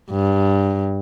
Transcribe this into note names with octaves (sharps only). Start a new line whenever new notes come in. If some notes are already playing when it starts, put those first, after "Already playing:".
G2